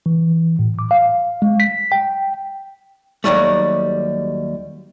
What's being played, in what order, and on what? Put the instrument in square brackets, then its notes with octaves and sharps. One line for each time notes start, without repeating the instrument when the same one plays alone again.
[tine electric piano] E3
A2
D6
F5
G#3
B6
G5
[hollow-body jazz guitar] D#2 A2 F#3 G3 A3